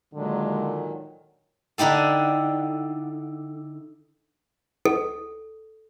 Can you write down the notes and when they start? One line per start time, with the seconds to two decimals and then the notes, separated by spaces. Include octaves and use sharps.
0.14 A#2 D3 D#3 F#3 G#3
1.78 D3 D#4 E4 G4 A4
4.86 A4